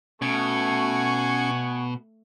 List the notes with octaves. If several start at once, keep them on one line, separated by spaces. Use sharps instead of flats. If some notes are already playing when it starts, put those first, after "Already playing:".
B2 A3 C#4 F#5 G#5 C#6 G#6 C#7